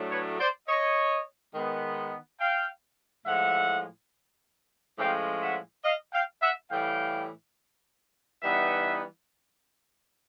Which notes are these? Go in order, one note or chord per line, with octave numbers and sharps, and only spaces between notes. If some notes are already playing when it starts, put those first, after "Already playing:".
Already playing: A2 F#3 A3 D4
B4 C#5
C5 D5
C#5 D#5
D#3 G#3 B3
F5 G5
A2 F3 G#3 E5 F#5
A2 F3 G#3 C#4 F5 G5
E5 F#5
D#5 F5
F5 G5
E5 F#5
A2 E3 G3 F5 G5
E3 G3 B3 D#4 E5 F#5